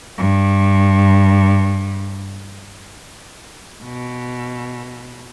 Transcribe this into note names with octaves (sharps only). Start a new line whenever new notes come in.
G2
B2